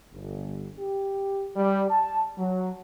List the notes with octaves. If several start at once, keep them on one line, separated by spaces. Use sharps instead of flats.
G1
G4
G3
A5
F#3